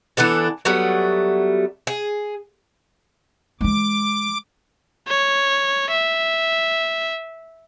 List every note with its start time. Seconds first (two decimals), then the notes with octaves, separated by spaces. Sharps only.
0.17 E3 B3 D4 A4
0.65 F#3 G3 A3 B3
1.87 G#4
3.61 E3 G#3 D6
5.08 C#5
5.91 E5